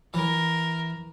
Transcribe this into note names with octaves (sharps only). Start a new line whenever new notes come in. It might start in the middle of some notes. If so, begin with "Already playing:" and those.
E3 A#4